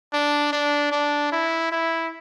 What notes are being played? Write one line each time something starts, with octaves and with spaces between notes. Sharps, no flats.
D4
D4
D4
E4
E4